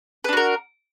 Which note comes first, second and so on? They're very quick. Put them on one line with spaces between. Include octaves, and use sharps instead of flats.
B4 D4 F#4 A#4